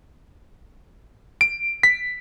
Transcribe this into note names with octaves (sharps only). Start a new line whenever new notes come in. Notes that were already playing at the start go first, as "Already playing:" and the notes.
D7
B6